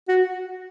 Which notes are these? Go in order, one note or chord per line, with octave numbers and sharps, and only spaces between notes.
F#4